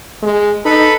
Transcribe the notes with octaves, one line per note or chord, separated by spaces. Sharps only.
G#3
D#4 A4 B4 B5